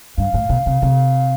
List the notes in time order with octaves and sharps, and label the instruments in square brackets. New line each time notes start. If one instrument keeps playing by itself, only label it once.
[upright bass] G2 [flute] F5
[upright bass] A2
B2
C3
C3